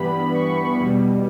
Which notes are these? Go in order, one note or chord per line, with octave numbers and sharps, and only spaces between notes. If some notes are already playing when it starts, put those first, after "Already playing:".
Already playing: G2 E3 G3 B3 B5
C#6
E2 B2 G3